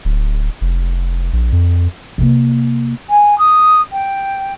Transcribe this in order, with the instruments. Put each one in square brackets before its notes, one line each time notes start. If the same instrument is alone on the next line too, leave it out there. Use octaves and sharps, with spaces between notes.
[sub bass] D1
F1
A#1
F2
[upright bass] C3 A#3
[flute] G#5
D#6
G5